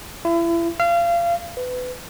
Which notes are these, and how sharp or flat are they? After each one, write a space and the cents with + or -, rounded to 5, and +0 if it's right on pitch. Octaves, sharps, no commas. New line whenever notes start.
E4 +35
F5 -30
B4 +25